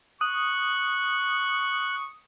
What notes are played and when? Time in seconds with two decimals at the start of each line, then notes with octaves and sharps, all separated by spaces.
0.21 C#6 D#6 F#6